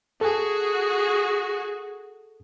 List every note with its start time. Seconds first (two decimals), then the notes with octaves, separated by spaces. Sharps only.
0.21 F#4 G#4 A4 G#5